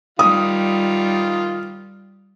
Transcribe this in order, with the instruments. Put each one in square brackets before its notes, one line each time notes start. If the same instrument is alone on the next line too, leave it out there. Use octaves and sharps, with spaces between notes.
[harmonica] D#3 F4 [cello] G3 [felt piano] D#6